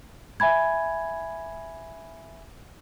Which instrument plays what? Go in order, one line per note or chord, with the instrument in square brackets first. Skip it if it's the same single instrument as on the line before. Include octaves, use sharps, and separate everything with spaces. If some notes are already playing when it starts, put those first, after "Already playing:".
[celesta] E5 G#5 B5 G#6